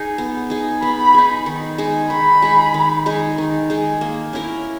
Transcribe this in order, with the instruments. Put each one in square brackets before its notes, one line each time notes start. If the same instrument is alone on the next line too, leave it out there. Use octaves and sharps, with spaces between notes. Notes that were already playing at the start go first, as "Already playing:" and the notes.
Already playing: [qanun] D#4 G#4
B3
D#4 G#4
[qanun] B3 [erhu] B5
[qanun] D#4 G#4
D#3
G#3 D#4 G#4
[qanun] D#3 [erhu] B5
[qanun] G#3 D#4 G#4
D#3
G#3 D#4 G#4
D#3
G#3 D#4 G#4
A#3
C#4 E4 A#4